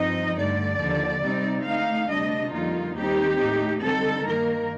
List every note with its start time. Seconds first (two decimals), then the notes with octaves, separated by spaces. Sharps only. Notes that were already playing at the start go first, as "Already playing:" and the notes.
Already playing: G2 F3 C4 D#4 D#5
0.37 G2 D3 A3 D5
0.80 D#2 D3 F3
1.22 C3 G3 C4 D#4
1.65 D3 A3 D#4 F5
2.09 D2 C3 G3 D4 D#5
2.52 F2 D3 G3 A#3 D#4 F4
2.95 D#2 D#3 G3 C4 D#4 G4
3.38 A2 A3 D#4
3.82 D3 G3 C4 D#4 A4
4.24 G2 D#3 A#3 A#4